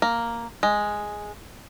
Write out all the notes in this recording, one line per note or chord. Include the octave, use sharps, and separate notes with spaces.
A#3
G#3